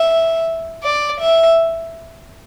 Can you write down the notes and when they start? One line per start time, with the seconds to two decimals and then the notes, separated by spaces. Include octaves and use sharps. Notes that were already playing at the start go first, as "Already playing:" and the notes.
Already playing: E5
0.83 D5
1.21 E5